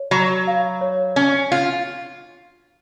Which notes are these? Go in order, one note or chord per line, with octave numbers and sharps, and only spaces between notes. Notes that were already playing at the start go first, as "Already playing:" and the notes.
Already playing: C#5
F#3 B5
F5
C#5
C#4 G#5
F4 F5